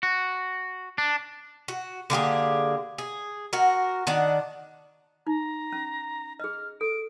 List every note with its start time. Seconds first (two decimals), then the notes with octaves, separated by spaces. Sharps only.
0.03 F#4
0.98 D4
1.68 F#4
2.10 D3 A#3 G4 G#4
2.98 G#4
3.53 F#4 A#4
4.07 D#3 D4 D5 F#5
5.27 D#4 A#5
5.72 C#4
6.40 G#4 D#5 F6
6.81 A4 D7